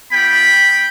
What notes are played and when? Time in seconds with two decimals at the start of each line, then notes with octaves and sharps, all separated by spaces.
0.12 B3 F4 G5 B5